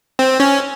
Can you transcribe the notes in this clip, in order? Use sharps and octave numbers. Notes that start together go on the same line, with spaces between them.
C4
C#4